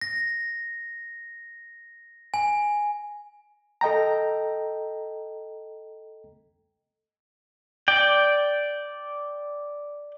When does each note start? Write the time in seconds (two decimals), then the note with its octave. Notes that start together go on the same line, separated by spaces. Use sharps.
0.01 A#6
2.34 G#5
3.81 A4 D#5 G5 A#5
7.88 D5 G5